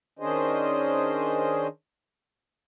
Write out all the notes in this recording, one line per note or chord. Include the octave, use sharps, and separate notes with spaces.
D#3 C#4 D4 G#4 C5 D#5